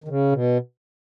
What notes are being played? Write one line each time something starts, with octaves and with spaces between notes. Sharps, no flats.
D#3
C#3
B2